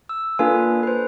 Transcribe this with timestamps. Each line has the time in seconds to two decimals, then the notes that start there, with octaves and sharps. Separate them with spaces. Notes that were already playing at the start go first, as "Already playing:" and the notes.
0.09 E6
0.39 A#3 D4 F4 A4 B4 G#5
0.83 B4 C5